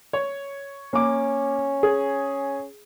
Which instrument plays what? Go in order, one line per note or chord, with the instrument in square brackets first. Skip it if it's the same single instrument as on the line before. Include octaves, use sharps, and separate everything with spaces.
[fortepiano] C#5
[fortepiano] A#3 D6 [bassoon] C#4
[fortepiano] G#4